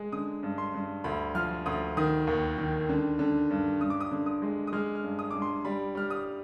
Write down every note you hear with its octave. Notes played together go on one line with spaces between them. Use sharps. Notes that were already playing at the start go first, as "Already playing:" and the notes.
Already playing: G#3
D3 D#6
G2
C6
G2
D2 B5
F3 F6
D2 D#6
D#3 D#6
D#2
D#3
D3
D3
G2
G2 D#6
D6
D#6
D3
D#6
G#3
D#6
G#3 F6
F6
G2
D#6
G2 D6
C6
G3 B5
G3 F6
D#6